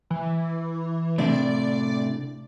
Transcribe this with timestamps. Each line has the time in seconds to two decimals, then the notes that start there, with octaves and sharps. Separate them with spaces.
0.10 E3
1.18 A2 C3 D4 D5